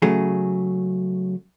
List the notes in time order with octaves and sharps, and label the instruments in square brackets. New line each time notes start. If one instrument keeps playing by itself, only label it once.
[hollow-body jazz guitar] C#3 F#3 A3 G#4